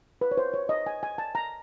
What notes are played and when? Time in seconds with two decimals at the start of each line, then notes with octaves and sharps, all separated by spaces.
0.21 B4
0.31 C#5
0.37 C5
0.54 C#5
0.69 D#5
0.86 G#5
1.03 G#5
1.18 A5
1.35 A#5